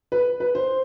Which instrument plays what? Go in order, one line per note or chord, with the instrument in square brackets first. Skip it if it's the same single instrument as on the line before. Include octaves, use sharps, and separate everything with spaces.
[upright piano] B4
B4
C5